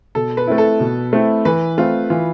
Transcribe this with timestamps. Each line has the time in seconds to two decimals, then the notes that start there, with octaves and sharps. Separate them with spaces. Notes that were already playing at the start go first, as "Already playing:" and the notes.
0.15 B2 A4
0.37 B4
0.47 A3 C4 E4
0.58 A4
0.80 B2
1.13 A3 C4 E4
1.45 E3 B4
1.78 A3 C4 F4
2.10 E3 F4